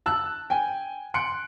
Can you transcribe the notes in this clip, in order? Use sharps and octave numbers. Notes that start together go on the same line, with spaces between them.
A5 E6 F#6
G5 G#5
C6 F#6 C#7 D7